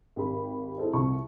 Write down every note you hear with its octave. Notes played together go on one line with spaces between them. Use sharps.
G#1 G4 B5
E4 G#4 A4 C5 D#5
C2 F2 C#6